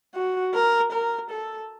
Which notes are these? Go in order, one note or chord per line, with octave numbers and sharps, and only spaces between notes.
F#4
A#4
A#4
A4